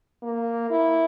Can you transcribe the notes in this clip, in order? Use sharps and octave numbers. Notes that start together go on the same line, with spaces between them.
A#3
E4